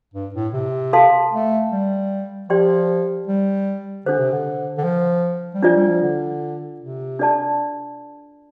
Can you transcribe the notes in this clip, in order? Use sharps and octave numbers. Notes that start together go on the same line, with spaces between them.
G2
A2
C3
A4 F5 A5 C6
A3
G3
F3 G4 D5 G5 C6
G3
D3 D4 A4 C5
C3
D3
D3
F3
G3
F3 D4 F4 D5
G3
F3
D3
C3
D4 A4 D5 A5